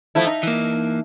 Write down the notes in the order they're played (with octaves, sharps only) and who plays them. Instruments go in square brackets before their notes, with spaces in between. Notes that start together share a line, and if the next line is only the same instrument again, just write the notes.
[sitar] F3 A3 E4
D#4
[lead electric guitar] E3 A#3